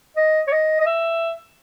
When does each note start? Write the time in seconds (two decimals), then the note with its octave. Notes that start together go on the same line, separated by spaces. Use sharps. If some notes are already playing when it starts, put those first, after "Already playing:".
0.16 D#5
0.47 C#5
0.52 D#5
0.80 D#5
0.86 E5